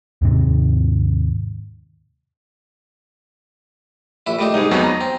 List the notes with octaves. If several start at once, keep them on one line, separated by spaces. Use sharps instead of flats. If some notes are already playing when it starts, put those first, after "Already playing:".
D#2 G#2 C3 G#3
A#1 E4
A2 G3 D#4
C2 G#2 D#4 G#4
F2 F#3 B3 C#4 D#4
A#5
C4